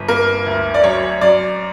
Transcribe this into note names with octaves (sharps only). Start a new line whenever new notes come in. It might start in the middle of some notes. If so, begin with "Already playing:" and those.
Already playing: G1
A#3 A#4
D2
D5
F#2 C#5
F#2 D5